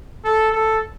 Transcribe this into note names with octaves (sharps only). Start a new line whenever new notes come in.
A4
A4